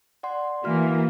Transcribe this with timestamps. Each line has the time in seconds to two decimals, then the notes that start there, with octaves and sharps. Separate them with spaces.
0.23 D5 F#5 C6
0.64 E3 A#3 F#4 F6